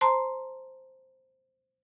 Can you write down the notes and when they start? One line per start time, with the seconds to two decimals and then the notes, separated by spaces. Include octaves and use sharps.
0.01 C5 A5 A#5 C6